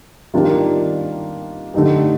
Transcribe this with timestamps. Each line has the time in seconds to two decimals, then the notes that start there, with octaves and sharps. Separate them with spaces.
0.34 D#3 G3 A#3 D4 F4
1.74 D3 A3 D#4 G4